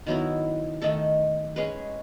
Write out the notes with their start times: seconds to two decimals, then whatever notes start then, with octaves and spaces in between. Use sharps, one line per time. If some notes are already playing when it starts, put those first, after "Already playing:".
0.07 D#3 F#3 B3 E4
0.82 D#3 A3 D#4 A4
1.56 G#3 C#4 G#4 B4